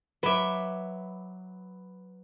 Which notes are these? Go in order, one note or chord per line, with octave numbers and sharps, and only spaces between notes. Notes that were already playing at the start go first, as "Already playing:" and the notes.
F#3 B4 E5 D6